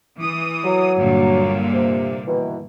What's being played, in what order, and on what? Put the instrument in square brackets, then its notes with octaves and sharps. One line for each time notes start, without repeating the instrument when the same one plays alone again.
[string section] E3 D#6
[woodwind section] F#3
[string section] G2 A#2 D3
[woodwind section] C3
B2 D#3 E3